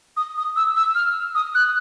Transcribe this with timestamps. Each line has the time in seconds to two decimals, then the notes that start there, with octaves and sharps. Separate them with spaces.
0.17 D#6
0.37 D#6
0.56 E6
0.76 E6
0.95 F6
1.35 D#6
1.55 F#6